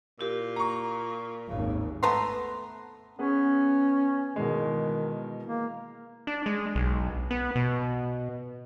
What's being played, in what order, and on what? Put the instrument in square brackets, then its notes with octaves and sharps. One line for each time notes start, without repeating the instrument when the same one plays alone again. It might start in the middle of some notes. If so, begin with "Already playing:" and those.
[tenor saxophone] A#2 [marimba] E4 G4 A#4
[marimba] A#3 [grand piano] A#5 C#6
[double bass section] G#1 D#2 [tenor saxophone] C#3
[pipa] A3 B3 A#5 C6
[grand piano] B3 G#4 B4 [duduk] C#4
[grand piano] B2 E3 G#3 [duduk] D#3
[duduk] A#3
[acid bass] D4
G#3
B1
B3
B2